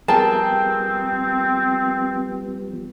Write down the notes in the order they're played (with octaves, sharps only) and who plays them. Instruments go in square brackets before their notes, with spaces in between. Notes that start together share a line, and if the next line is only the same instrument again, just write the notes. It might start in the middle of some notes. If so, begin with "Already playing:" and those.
[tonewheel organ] F3 G3 B3 [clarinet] C4 [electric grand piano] G#4 A#4 G5 [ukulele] A5